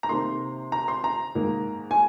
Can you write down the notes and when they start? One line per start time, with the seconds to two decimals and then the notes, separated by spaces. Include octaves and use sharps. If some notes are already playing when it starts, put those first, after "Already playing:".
0.03 A#5
0.09 C3 D#3 A#3 C6
0.72 A#5
0.88 C6
1.04 A#5
1.35 G#2 D#3 A#3
1.91 G#5